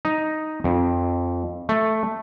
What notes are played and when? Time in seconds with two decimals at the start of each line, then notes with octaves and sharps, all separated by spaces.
0.05 D#4
0.64 F2
1.69 A3